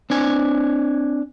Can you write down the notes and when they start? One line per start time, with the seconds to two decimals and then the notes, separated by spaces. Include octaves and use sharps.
0.10 C4 D4 G#5